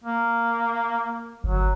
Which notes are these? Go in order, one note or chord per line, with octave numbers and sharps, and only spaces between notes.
A#3
G1 F#3